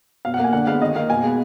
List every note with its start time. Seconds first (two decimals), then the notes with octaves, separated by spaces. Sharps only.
0.25 B2 F5
0.34 F#5
0.39 A#3
0.44 G#5
0.53 D3 F#5
0.67 G#3 B3 F5
0.82 D#3 D#5
0.95 A#3 F5
1.09 B2 G#5
1.23 G#3 B3